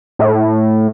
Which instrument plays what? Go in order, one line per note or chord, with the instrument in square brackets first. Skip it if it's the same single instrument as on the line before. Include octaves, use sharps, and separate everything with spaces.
[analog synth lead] A2